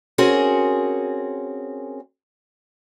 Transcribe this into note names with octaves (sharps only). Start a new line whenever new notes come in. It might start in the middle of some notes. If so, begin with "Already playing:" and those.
C4 C#4 F#4 G#4 A#4